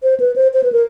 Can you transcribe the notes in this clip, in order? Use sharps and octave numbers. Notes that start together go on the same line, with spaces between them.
C5
B4
C5
C5
B4
A#4